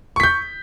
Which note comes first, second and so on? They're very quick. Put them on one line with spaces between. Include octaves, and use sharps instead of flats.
C#6 B6 G6